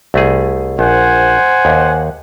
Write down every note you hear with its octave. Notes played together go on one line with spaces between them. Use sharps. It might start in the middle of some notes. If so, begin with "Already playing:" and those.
C2 A3 G#4
A#1 C5 F#5 G#5
D#2